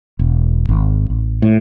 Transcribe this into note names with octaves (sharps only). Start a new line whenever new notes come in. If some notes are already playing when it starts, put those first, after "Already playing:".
E1
G#1
A1
A2